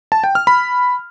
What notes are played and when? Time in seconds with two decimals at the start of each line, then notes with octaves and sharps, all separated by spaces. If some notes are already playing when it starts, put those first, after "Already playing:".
0.12 A5
0.24 G5
0.35 F6
0.47 B5